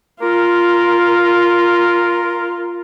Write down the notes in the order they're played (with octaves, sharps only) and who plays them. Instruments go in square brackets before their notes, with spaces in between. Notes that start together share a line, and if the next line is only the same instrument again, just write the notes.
[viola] F4 [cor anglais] A#4